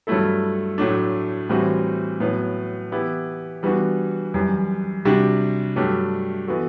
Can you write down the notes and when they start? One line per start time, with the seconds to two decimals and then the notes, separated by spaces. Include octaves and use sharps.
0.07 G2 F#3 A3 E4 A4
0.78 A2 F#3 A3 D4
1.49 A2 E3 G3 C4 F#4
2.20 A2 F#3 B3
2.91 E3 B3 E4 G4
3.63 E3 G3 B3 D4 F#4
4.34 F#2 E3 G3
5.05 C3 G3 D4 F#4
5.76 G2 F#3 A3 D4 G4
6.48 E3 B3 F#4 A4